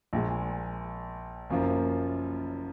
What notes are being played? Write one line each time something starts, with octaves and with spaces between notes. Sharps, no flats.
A#1 A#2 G#3
F#1 F#2 F3 A#3